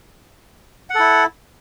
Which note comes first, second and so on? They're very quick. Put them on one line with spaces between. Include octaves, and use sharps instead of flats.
F#5 A4 E4